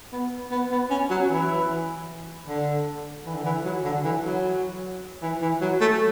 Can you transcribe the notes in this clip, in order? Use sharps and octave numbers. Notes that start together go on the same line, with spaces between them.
B3
B3
B3
C#4
F#3
E3
D3
E3
D3
E3
F#3
D3
E3
F#3
E3
E3
F#3
A3